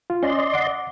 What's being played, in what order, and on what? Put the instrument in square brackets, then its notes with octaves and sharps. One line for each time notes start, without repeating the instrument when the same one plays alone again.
[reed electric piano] F4
[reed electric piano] C#4 [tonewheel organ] D5 D#5 C6
[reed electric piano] F#5 D6